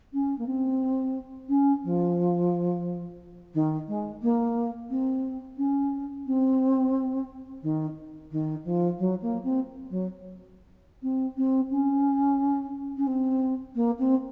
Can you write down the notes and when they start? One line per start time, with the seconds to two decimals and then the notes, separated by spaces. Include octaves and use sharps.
0.13 C#4
0.38 A#3
0.46 C4
1.49 C#4
1.84 F3
3.54 D#3
3.88 G#3
4.22 A#3
4.90 C4
5.57 C#4
6.26 C4
7.62 D#3
8.31 D#3
8.64 F3
8.99 F#3
9.21 A#3
9.43 C4
9.90 F#3
11.02 C4
11.37 C4
11.70 C#4
12.97 C#4
13.07 C4
13.75 A#3
13.99 C4